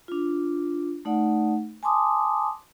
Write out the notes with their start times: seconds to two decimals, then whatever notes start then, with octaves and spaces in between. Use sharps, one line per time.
0.08 D4 F4
1.05 A3 D#4 D5 F#5
1.83 G#5 A5 C6 D6 D#6